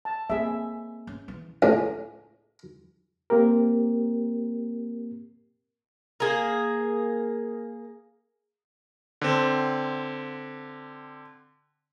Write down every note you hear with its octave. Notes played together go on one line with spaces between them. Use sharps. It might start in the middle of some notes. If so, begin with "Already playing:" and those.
A5
A#3 C4 G#4 E5
C#4
E3
C#2 A2 C#3
A#3 C4 G4 A#4
A#3 G#4
D3 C4